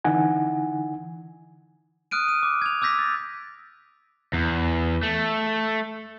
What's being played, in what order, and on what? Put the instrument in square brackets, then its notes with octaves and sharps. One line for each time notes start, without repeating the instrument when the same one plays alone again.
[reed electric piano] D3 E3 D#4 F#5 G#5
[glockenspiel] D#6 F6 F#6 D7 D#7
D#7
D6
G#6 F7
D6 E6 G6 A#6 B6
A6
[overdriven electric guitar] E2
A3